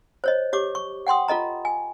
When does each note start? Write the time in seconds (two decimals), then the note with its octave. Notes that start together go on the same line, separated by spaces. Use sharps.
0.24 C5 C#5 D#5
0.53 G4 C#5 D6
0.75 C#6
1.07 F#5 G5 C6 D#6
1.28 F4 A4 D#5 A#5
1.65 G#5